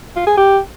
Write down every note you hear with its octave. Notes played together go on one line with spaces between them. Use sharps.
F4
G#4
G4